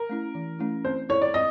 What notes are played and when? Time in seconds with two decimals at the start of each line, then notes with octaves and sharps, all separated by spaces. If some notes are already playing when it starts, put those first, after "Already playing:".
Already playing: A#4
0.09 A3 C#4 E4
0.35 E3
0.59 A3 C#4 E4
0.85 C4 C5
1.09 E4 A4 C#5 D5
1.22 D5
1.34 C4 D#5